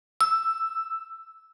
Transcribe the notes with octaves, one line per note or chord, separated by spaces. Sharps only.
E6